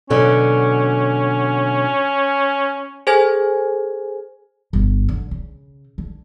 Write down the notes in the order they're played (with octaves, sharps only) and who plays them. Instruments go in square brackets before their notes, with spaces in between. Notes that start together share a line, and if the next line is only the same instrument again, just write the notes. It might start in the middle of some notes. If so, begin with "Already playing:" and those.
[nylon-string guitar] B2 D3 F#3 [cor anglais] C#4
[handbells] G#4 A4 C5 G#5 G#6
[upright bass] G1
D3
C#3
D3